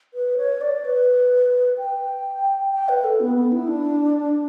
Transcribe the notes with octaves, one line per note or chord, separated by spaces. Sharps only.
B4
C#5
D5
B4
G5
G5
B4
A4
B3
B3
E4
D4